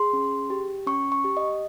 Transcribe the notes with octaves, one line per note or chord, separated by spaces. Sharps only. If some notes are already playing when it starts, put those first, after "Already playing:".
Already playing: G#4 C6
C#4
G4
C#4 C#6
C#6
G4
D#5